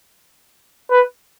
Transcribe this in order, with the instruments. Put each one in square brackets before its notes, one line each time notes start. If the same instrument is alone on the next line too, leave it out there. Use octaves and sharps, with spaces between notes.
[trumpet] B4